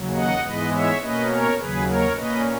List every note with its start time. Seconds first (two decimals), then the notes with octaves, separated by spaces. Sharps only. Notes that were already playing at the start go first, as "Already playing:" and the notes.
Already playing: D#2 C#3 F#3
0.15 D#5 F#5
0.44 G#2 E3 G#3 B3 B4 D#5
0.72 C#5 E5
1.01 B2 A#3 C#4 B4 D#5
1.30 A#4 C#5
1.58 D#2 C#3 F#3 G#4 B4
1.87 A#4 C#5
2.16 A#2 A#3 C#4 B4 D#5